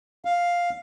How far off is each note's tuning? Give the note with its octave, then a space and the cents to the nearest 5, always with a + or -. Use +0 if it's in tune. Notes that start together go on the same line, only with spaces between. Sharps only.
F5 +5